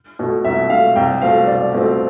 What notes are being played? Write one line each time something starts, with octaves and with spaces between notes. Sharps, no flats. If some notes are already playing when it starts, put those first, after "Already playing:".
B2 A3
C2 E5
B2 A3 F5
C2 G5
B2 A3 C4 F5
C2 D5
B2 A3 C4